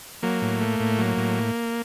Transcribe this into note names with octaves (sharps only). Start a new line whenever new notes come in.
F#3 A#3
A2
A3
A2
F#3
A2